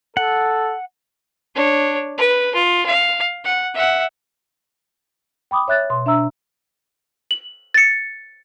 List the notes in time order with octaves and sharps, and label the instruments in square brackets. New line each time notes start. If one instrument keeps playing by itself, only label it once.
[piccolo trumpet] A4 [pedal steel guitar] F#5
[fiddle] D4 C#5
B4
F4
F5
F#5
E5 F#5
[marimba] G5 B5 D6 D#6
C#5 E5 F#6 A6
B2 C6
D4 E5 A#5 E6
[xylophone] F#7
A6 C#7